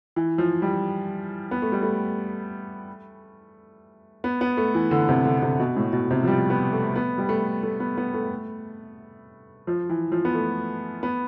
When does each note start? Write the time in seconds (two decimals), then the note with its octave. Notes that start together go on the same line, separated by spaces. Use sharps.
0.16 E3
0.38 F3
0.62 G3
1.51 B3
1.62 A3
1.72 G3
1.82 A3
4.24 B3
4.41 B3
4.57 A3
4.74 E3
4.91 D3
5.09 C3
5.25 D3
5.38 D3
5.42 C3
5.60 B2
5.77 A2
5.93 B2
6.11 C3
6.23 F3
6.27 G3
6.50 B3
6.73 A3
6.96 B3
7.18 G3
7.29 A3
7.63 A3
7.80 B3
7.98 B3
8.14 A3
9.67 F3
9.90 E3
10.12 F3
10.25 B3
10.34 A3
11.03 B3